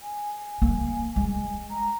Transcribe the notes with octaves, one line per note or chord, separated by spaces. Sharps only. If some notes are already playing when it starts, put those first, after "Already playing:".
G#5
A#3
G#3
A#5